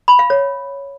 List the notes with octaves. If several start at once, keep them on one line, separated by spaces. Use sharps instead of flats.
B5
F5
C#5